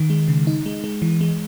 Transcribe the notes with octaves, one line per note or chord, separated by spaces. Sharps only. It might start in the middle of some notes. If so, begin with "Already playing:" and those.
Already playing: D#3
G#3
C#3
D#4
G#3
G#3
E3
G#3